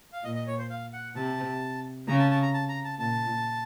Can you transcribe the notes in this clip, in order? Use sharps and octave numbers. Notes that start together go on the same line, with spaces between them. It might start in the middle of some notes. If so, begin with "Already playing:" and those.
F5
A#2 D#5
D#5
C#5
C5
F5
F#5
C3 A5
C#3 A#5
A5
A5
A#5
A5
A#5
A5
A#2 A5